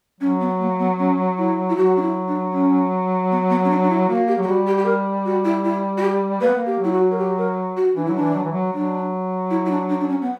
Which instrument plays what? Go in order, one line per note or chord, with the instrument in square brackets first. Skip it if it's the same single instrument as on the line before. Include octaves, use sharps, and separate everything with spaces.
[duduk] F#3 [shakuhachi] C#4
[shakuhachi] B3
A#3
B3
C#4
E4
E4
[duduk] F#3 [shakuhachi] F#4
[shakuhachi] D4
E4
D4
C#4
B3
B3
C#4
D4
D4
E4
[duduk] A#3 [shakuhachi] F#4
[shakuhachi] G4
[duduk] F#3
[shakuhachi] G4
[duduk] G3 [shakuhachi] F#4
[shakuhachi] G4
G4
A#4
F#4
E4
E4
F#4
G4
[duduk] A#3 [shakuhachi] B4
[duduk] B3
A#3
[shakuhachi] G4
[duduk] F#3 [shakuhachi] E4
[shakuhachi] F#4
A#4
G4
A#4
F#4
[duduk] E3 [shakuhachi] D4
[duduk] F#3 [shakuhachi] E4
[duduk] E3 [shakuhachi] D4
[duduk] F#3
E3
F#3
[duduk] F#3 [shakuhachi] D4
[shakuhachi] E4
E4
D4
D4
D4
C#4
B3